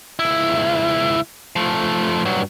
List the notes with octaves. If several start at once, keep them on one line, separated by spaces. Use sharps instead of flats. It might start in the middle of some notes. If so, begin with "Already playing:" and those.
C#2 E4
F3 A3
G2 F#3